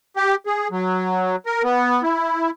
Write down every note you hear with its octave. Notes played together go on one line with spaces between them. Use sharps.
G4
G#4
F#3
A#4
B3
E4